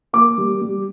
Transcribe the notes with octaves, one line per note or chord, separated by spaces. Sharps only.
A#3 D6
G3
G3